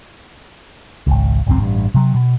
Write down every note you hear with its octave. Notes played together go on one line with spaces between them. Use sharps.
G#1 C#2
G#1 C#2 F#2 C4
A1 G2
C3 F#3
B2